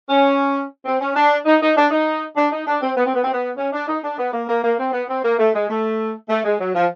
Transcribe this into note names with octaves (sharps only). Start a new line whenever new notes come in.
C#4
C4
C#4
D4
D#4
D#4
D4
D#4
D4
D#4
D4
C4
B3
C4
B3
C4
B3
C#4
D4
D#4
D4
B3
A#3
A#3
A#3
C4
B3
C4
A#3
A3
G#3
A3
A3
G#3
F#3
F3